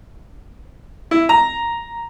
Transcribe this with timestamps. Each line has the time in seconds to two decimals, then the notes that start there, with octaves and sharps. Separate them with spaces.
1.11 E4
1.29 A#5